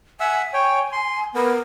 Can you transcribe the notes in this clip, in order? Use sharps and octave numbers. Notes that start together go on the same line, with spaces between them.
E5 F#5 G#5 E6
C#5 G5
C6
B3 A#4